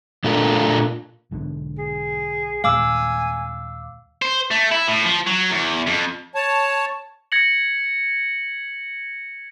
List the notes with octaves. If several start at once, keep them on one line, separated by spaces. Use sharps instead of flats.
A#2 A3 D4 F4 A4 A#4
B1 G#2 D3
G#4
D#2 A#2 G#3 F5 G#5 D6 E6
C5
A3
E4
A2
F3
F#3
E2
F2
C#5 A5
G#6 A#6 C#7 F#7